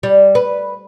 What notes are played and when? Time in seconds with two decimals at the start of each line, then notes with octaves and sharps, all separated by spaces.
0.03 G3
0.35 B4